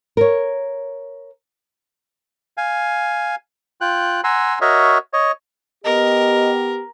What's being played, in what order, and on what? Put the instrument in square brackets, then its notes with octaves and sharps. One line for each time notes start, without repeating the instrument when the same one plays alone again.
[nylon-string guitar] A#4 C#5
[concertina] F5 G#5
F4 G5 F#6
F#5 G#5 A#5 C6 E6
F#4 A#4 C#5 D#5 E5
C#5 D#5
[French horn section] B3 G4 [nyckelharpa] A#4 [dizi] D#5